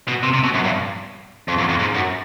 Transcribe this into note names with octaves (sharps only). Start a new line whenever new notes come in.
B2
C3
C3
B2
F#2
G2
F2
E2
F2
G#2
F#2